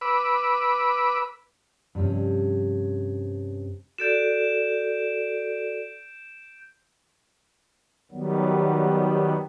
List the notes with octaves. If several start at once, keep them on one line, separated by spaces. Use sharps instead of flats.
B4 B5 D6 E6
G2 C3 F3 C#4
F#4 A4 D5 G6 D7 E7
D#3 F#3 G3 B3